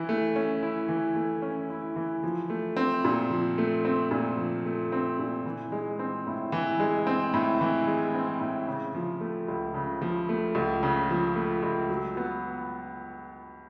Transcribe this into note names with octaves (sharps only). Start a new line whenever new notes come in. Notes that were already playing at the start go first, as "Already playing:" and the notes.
Already playing: E3 E4
A3
C#4
E4
E3
A3
C#4
E4
E3
F3
A3
C4
A#2
F3
A3
C4
A#2
F3
A3
C4
A#2
E3
G#3
C4
A2
E3
G#3
C4
A2
E3
G#3
C4
A2
C#3
F3
A3
C#2
C#3
F3
A3
C#2
C#3
F3
A3
C#2
F#3
B3